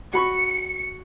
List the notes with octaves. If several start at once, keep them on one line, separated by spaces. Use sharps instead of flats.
F#4 B5 C#6 C#7